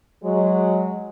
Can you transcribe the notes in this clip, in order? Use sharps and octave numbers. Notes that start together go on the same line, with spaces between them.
F#3 G#3